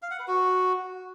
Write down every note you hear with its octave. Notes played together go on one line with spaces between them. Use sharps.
F5
F#5
B4
F#4